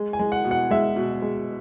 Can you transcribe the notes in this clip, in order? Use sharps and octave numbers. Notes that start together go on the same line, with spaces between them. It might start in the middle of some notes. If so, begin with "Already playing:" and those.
Already playing: G#3
G#5
G#3
F#5
B2
F#5
G#3 E5
B2
G#3